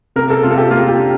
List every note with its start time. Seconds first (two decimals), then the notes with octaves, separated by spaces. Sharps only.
0.16 C3 A#4
0.30 A4
0.43 C3 F4
0.51 A4
0.58 G4
0.71 A#3 F4
0.88 G4
0.99 D4